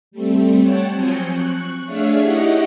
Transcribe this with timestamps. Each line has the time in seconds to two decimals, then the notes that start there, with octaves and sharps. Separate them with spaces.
0.11 G3 A3 C4
0.60 C#5 F#5 G5 A5
0.91 F3 F#3 C4 G#5 G6 C#7
1.26 C#6 F#6
1.86 A3 D4 G#4 C#5 E5 F5
2.19 D#4 E4 G4 D#5 F#5 C#6